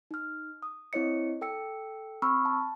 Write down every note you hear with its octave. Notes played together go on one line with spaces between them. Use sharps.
D#4 F6
D#6
C4 E4 C#5 D#5 C#7
A4 G5 E6 C#7
C4 B5 C#6 E6 F6
A5